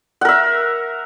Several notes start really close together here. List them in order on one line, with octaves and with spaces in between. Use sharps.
F#5 A#4 E5